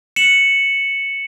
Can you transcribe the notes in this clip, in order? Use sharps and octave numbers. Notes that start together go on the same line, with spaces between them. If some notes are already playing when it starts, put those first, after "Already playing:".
C#7 E7 F#7